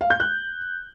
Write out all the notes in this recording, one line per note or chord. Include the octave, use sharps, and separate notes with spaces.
F5
G6
F#6